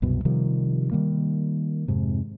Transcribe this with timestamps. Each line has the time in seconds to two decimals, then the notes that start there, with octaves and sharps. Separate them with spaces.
0.02 C2 F#2 B2
0.25 C3 D#3 F3 G3
0.91 D#3 G3 A#3
1.88 F2 G#2 C3